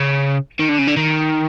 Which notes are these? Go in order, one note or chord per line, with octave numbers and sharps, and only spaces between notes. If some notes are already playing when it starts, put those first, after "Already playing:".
Already playing: C#3
D#3
D3
C#3
D3
D#3